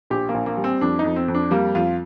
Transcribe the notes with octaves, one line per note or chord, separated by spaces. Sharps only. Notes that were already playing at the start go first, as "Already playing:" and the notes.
A#1 G4
A#3
A#1
A#3
G3
C4
F2 D4
D#4
F2
C4
F2
D4
G3 A#3
F2 F4